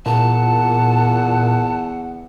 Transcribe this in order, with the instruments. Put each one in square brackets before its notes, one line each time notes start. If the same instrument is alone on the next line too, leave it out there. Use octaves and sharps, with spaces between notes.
[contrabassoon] E2 [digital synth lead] A#2 [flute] F#5 [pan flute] A5